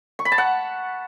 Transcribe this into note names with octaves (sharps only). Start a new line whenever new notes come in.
C#6
B5
A5
F#5